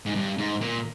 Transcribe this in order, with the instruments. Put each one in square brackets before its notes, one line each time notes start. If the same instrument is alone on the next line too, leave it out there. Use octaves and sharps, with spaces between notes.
[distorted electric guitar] G#2
G2
G#2
A#2